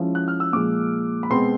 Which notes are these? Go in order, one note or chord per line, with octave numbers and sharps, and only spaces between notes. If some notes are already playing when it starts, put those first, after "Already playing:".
Already playing: F3 G#3 C#4 E4
F#6
F6
E6
A#2 F3 G#3 D6
B5
B2 G#3 C4 C6